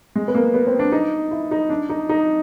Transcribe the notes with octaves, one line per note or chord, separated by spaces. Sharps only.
G#3
B3
A#3
B3
C4
D4
D#4
E4
D#4
D4
D#4
D#4